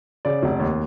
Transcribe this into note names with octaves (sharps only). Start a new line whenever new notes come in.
C#3 D5
F1
D#2